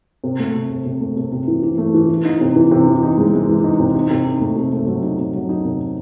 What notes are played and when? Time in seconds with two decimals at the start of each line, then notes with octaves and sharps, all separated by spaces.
0.24 C3
0.39 A3
0.55 C3
0.70 C3
0.85 C3
1.01 A3
1.17 C3
1.32 C3
1.48 E3
1.63 E3
1.78 A3
1.94 E3
2.09 E3
2.25 D#4
2.41 C3
2.56 E3
2.71 C3
2.87 E3
3.03 D#4
3.18 G#3
3.33 G#3
3.49 E3
3.64 D#4
3.80 C3
3.95 D#4
4.10 C3
4.26 D#4
4.41 A3
4.56 C3
4.72 A3
4.87 F#3
5.03 D#4
5.18 C3
5.34 F#3
5.49 D#4
5.64 C3